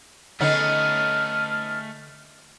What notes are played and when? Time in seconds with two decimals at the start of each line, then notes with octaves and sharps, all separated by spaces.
0.40 D3 A3 B3 C#4 D#4 G#4 F6